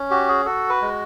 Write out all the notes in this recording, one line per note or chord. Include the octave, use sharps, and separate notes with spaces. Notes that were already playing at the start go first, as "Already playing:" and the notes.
Already playing: C#4
F#4 G4
G#4
F#4 A4
B4
G#3